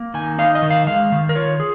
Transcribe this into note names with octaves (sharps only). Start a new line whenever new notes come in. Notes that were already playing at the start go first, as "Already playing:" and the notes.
Already playing: A#3
D#3 G#5
D#4 F5
D#5
D#3
F5
G#3 F5
D#3
A#4
F4 C#5
G#4